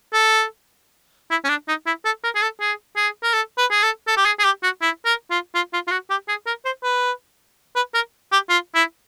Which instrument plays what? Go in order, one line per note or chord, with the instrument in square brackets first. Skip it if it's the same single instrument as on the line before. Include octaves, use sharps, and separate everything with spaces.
[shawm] A4
E4
C#4
D4
D#4
E4
A4
A#4
G#4
A4
G#4
G#4
A#4
A4
B4
G#4
A4
A4
G4
G#4
G#4
G4
F#4
E4
A#4
F4
F4
F4
F4
F#4
G4
G#4
A#4
C5
B4
B4
A#4
G4
F4
E4